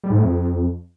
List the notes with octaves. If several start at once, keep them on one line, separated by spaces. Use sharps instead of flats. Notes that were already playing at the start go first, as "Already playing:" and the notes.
G3
G#2
A2
F2